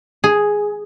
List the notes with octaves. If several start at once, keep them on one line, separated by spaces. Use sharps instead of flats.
G#4